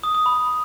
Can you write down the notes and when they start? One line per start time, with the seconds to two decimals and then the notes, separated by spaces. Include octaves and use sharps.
0.04 D#6
0.15 D#6
0.26 B5